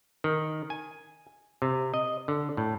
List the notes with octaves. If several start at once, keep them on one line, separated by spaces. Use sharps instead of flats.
D#3
G#5
C3
D#5
D3
A2